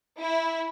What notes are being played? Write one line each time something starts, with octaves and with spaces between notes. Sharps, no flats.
E4